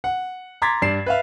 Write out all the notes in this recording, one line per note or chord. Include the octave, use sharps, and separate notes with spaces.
F#5
A#5 C6 D6 G#6 A6 B6
G2 D5 C7 E7
B4 E5 F5